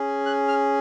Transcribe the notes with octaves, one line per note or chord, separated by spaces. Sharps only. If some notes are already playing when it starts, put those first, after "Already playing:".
Already playing: C#4 G#4
F#6
F6